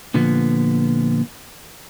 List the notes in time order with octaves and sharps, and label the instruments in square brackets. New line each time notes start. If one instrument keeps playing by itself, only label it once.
[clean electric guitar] A#2 D3 F3 B3